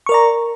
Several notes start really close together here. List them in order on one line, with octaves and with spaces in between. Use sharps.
C#6 A#4 D5 A#5